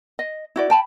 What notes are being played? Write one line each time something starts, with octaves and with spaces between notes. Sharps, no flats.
D#5
E4 F#4 D5
G5 A5 B5